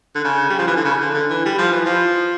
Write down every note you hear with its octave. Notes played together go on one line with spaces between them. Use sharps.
D3
C#3
G3
F3
E3
D3
C#3
D3
D3
E3
G3
F3
E3
F3